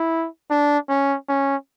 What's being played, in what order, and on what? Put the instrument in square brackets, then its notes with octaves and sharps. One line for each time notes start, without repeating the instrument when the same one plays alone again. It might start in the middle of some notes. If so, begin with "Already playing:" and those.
Already playing: [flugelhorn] E4
D4
C#4
C#4